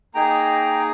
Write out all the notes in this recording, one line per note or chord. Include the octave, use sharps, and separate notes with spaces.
A#3 D#4 G#4 G5 A#5